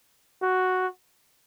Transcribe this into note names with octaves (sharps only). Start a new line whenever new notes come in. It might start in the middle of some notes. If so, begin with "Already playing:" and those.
F#4